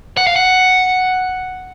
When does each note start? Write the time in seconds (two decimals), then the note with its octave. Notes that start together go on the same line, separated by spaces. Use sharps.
0.17 F#5
0.27 F5
0.36 F#5